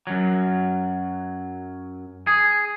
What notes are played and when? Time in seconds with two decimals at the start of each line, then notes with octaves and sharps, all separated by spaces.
0.07 F#2 F#3
2.27 G#4